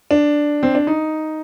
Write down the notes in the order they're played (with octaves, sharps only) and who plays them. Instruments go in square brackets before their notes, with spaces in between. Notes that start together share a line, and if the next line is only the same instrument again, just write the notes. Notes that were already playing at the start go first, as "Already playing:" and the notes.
[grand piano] D4
C4
D4
D#4